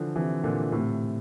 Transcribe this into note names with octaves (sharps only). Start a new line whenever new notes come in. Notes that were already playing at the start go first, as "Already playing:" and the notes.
Already playing: D3 E3 F3
C3 E3
A#2 D3
A2 C3